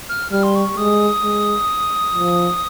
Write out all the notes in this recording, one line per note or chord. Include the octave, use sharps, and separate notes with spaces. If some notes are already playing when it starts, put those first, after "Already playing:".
F6
G3 F6
C6
C#6
G#3 D#6
G#3
F3